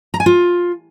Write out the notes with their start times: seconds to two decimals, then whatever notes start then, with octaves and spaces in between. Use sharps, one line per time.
0.14 A#5
0.20 G#5
0.26 F4